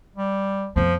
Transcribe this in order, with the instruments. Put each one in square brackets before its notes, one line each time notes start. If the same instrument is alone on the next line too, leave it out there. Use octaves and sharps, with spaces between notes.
[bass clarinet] G3
[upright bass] F2 B3 [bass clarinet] F3